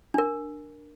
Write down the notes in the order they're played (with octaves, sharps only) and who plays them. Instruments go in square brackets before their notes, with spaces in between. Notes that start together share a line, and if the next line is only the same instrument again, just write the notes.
[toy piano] D4 A#4